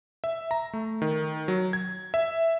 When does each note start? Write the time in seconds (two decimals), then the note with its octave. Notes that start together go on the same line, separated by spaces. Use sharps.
0.24 E5
0.51 A#5
0.73 A3
1.02 D#3
1.48 F#3
1.73 G#6
2.14 E5